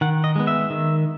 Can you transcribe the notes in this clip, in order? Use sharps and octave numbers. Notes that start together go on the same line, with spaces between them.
D#3 F#5
D#5
G#3 B3
E5
D#3